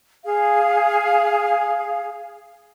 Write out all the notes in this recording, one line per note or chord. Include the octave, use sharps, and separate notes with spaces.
G#4 F5